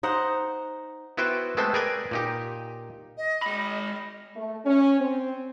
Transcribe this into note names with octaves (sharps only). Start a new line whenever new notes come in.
D#4 C5 F#5
B3 E4 F#4 B4 C5 G5
G#3 A3 B3 C4 A4 C5
G#4 A#4 B4 D5 G5 G#5
A#2 D#4 G4
D#5
G#3 B5
D#5
A3
C#4
C4